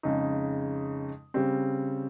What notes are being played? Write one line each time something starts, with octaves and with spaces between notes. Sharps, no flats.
F2 C#3 G#3 D#4
C#3 G3 C4